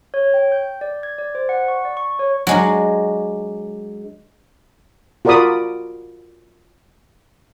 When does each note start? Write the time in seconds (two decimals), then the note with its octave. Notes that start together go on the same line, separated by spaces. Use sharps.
0.14 C#5
0.34 G5
0.52 G6
0.81 D5
1.03 G#6
1.19 D5
1.35 C5
1.49 F#5
1.68 C#6
1.85 D5
1.97 C#6
2.19 C#5
2.47 F#3 G#3 D4
5.25 F4 F#4 A#4 D5 B5 D#6